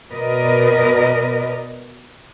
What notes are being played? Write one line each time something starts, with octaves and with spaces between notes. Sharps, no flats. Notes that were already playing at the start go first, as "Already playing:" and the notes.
B2 A#4 B4 D5 D#5